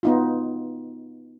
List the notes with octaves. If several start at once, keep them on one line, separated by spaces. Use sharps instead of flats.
B3 D#4 F4